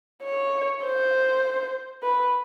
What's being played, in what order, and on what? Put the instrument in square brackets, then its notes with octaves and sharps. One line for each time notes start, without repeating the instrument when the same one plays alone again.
[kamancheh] C#5
C5
B4